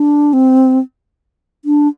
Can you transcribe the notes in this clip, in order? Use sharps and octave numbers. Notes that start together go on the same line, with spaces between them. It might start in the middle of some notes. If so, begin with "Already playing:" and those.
Already playing: D4
C4
D4